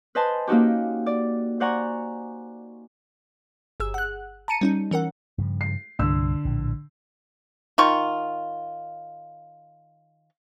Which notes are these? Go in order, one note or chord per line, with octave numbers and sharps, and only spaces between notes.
B4 C5 D#5 G#5 A5 C6
A#3 C#4 D#4 F#4 G4
D5
C5 D5 F#5 G#5 A#5 C#6
G1 G#4 E6
F#5 F#6
A5 A#5 C#7 D#7
G3 C#4 D#4
E3 C#4 A#4 F#5
G2 C#3 F3
C7
C2 G2 D3 E6
A#1 A2
D#3 F4 C#6